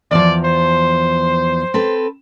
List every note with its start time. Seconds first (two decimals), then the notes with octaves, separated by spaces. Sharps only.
0.11 E2 F3 D5
0.45 C5
1.74 C4 A4 B4